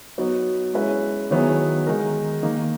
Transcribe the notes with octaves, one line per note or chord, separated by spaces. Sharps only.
F#3 B3 D#4 F#4
G#3 C#4 E4 B4
D#3 F#3 B3 E4 G#4
D#3 G#3 D#4 A#4
D#3 A#3 D#4 A#4